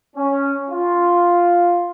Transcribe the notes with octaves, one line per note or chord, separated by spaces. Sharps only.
C#4
F4